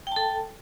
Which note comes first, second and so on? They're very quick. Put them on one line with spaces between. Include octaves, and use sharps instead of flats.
G5 A5 A4